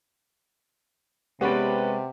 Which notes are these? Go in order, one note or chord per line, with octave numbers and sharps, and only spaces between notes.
C3 G#3 B3 C#4 G4 B4 D5 F#5